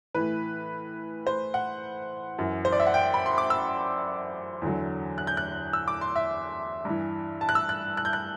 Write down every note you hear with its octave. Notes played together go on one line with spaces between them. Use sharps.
A2 E3 B4
C5
F#5
F#2 E3
C5
D5
E5
F#5
G5
B5
C6
D6
E6
E2 D3 F#3
F#6
G6
F#6
E6
D6
C6
E5
G2 E3
A5
F#6
E6
F#6
F#6
G6
F#6